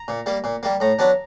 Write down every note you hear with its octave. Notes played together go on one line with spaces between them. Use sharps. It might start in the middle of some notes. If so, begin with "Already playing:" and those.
Already playing: A#5
A#2
G3 A#3
A#2
G3 A#3
A2 A#5
F#3 B3 D4